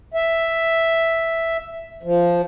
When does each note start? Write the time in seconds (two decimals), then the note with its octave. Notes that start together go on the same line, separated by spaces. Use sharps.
0.14 E5
2.03 F3